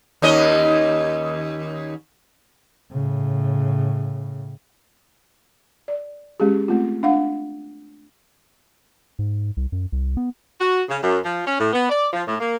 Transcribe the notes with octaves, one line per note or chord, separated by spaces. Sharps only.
D#2 C#4 D#5
A2 C#3
D5
G#3 C#4 G4 G#4
A3 C4 F4
D4 F5 F#5
G#2
C2
F#2
C2
B3
F#4
C#3
F#2
F3
C#4
A2
B3
D5
F3
A2
A#3